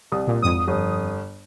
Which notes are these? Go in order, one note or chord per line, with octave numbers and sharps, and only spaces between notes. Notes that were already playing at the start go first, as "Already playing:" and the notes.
C2 D#6
A#2
G#1 F2 D#6
G1